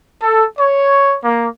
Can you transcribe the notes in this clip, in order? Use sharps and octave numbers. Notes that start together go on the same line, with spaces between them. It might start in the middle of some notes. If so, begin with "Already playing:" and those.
A4
C#5
A#3